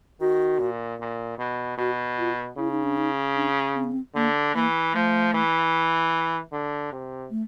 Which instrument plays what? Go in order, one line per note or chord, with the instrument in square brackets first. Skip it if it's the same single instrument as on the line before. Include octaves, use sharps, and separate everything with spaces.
[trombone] D#3 [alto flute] F#4
[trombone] A#2
A#2
B2
[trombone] B2 [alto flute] F#4
[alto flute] F4
[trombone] C#3 [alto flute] E4
[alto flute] D#4
D4
D#4
D4
C4
B3
C4
[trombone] D3 [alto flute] A#3
[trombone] E3 [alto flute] A#3
[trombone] F3 [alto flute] A3
[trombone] E3
D3
C3
[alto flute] A3